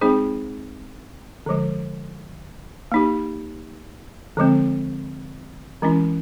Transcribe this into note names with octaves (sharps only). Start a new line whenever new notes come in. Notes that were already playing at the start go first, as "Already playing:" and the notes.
G#3 C4 D#4 G#4 C5
D3 F3 G#3
A#3 D#4 G4
D3 F3 G#3 C4
E3 G#3 C#4 E4